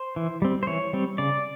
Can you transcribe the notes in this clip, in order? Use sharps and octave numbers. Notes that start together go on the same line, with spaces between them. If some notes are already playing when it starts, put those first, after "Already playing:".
Already playing: C5
E3
G3 C4
C5
E3 C#5
G3 C4
C#3 D5